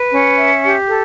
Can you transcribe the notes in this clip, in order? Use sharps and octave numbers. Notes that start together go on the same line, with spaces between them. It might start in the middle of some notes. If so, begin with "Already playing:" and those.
Already playing: B4
C#4
E5
G4
A4